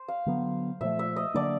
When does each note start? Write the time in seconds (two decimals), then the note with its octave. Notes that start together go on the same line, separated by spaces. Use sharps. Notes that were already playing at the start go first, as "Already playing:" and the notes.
Already playing: C5
0.08 F5
0.26 D3 F#3 B3
0.81 A#2 F3 A3 E5
0.99 E5
1.16 D#5
1.34 D3 F#3 A#3 D4 D5